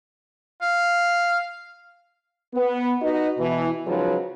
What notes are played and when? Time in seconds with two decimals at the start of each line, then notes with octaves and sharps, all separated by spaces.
0.62 F5
2.54 B3
3.02 D#4 F#4 B4 D#5
3.38 B2 E3 E4
3.86 C#3 F3 F#3 G#3 D#4 B4